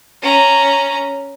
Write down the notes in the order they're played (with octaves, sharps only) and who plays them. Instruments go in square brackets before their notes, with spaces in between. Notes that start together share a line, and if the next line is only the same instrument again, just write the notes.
[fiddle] C#4 A#5